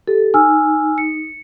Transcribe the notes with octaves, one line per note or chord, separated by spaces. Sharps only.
G4 A4
D#4 G#5 E6 F6
C#7